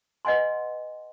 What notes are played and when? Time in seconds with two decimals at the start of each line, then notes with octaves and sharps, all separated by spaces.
0.25 B4 D#5 F#5 G#5 C6